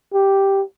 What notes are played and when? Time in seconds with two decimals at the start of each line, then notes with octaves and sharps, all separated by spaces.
0.14 G4